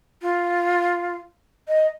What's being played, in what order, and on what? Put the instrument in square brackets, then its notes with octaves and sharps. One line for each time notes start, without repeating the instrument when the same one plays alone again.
[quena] F4
D#5